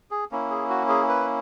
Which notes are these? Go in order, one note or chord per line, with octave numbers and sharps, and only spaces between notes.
G#4
A#3 C#4 E4
G#4
F#4
G#4
B4